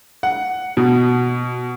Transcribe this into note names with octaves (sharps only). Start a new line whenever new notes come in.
F#5
B2